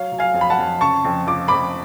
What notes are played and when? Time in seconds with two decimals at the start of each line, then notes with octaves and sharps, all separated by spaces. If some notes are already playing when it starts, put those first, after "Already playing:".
Already playing: F#3 C#5 F5
0.12 F#3
0.19 F5 G#5
0.34 F2
0.41 B5
0.50 F#5 A5
0.58 F2
0.81 C#3 A5 C#6
1.05 F2
1.27 F3 D6
1.48 F2 B5 D6